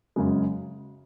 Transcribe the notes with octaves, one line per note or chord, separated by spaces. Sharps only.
F#2 C#3 G#3